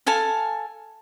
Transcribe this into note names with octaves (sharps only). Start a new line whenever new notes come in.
A4 F5 G#5 A5